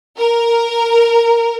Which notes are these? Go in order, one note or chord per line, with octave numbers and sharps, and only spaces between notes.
A#4